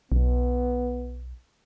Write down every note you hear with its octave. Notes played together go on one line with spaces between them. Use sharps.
B1 B3